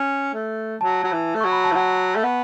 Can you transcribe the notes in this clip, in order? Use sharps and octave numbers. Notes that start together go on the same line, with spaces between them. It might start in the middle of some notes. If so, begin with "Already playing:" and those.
Already playing: C#4
A3
F#3 A5
F#3
E3
A3
F#3 C#6
B5
A5
E3
F#3 F#5
A3
B3